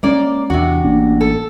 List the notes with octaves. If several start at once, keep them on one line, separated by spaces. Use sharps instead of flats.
G#3 A#3 C#4 D5
E2 C3 D4 F#4
A1 A#3 D4
A4